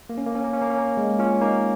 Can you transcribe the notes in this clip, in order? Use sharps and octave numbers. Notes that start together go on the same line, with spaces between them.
A#3
C#4
A#3
C#4
A#3
C#4
A#3
C#4
A#3
G#3
C#4 F4
A#3 D#4